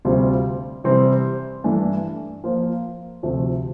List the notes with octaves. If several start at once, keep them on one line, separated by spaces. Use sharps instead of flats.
D2 C3 G3 C4 F4
C3 E3 G3 C4
G2 E3 A3 D4 A4
F3 A#3 F4 C5
D2 C3 F3 A3